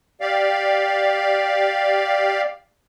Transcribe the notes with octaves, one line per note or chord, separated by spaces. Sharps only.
G4 D5 F5